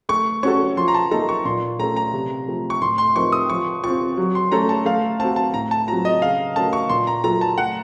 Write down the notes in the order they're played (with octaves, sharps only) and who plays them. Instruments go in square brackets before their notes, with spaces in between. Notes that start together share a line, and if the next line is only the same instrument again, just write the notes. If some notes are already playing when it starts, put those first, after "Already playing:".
[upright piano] A3 [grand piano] C#6
[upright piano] C#4 F#4 A4 [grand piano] C#6
[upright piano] F3 [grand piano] C6
[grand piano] A#5
A5
[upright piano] A#3 D#4 A4 [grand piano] A#5
[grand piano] C#6
[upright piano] A#2 [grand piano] C6
[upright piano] A3 C#4 A4 [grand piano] A#5
[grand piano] A#5
[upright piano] C3
F3 A3
[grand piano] C#6
[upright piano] A2 [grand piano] C6
[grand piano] C6
[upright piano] F3 C4 D#4 A#4 [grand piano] C#6
[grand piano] D#6
[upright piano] F3 [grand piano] C#6
[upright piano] C4 F4 [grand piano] C#6
[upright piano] F#3
[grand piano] C6
[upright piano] A3 C#4 A4 [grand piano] A#5
[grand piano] A5
[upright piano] A3 [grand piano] F5
[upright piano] C4 [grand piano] A5
[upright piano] F#4
[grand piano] A5
[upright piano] A2 [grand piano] A#5
[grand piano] A5
[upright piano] F#3 C4 F4 [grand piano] A#5
[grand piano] D#5
[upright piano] C#3 [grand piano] F5
[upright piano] A3 C#4 F#4 A#4 [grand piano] A5
[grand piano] C#6
[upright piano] A#2 [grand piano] C6
[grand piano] A#5
[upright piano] F#3 A#3 F4 A4 [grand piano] A#5
[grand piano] A5
[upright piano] A3 [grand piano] F#5